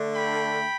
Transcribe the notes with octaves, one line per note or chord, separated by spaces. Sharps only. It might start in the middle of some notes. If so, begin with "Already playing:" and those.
Already playing: D3 A3 D4
G5 B5